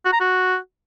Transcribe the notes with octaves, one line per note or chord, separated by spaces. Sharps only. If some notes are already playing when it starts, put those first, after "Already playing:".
F#4
A#5
F#4